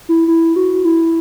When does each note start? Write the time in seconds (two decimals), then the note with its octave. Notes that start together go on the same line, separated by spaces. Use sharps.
0.09 E4
0.28 E4
0.56 F#4
0.85 E4